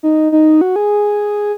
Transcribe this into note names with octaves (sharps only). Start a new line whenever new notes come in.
D#4
D#4
F#4
G#4